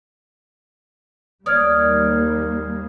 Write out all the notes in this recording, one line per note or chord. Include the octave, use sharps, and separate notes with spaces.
D#2 G3 A#3 C#5 D5 D#6 F6 G#6